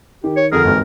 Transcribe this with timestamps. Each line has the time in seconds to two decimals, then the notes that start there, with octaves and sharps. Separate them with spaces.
0.24 D#3 G4
0.37 C#5
0.52 F2 D3 G#4 A#4 F6
0.64 G#1 D#2 E3